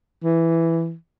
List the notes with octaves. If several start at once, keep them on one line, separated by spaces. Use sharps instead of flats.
E3